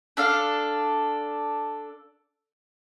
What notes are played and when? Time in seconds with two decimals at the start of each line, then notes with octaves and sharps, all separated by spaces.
0.17 D4 A4 F5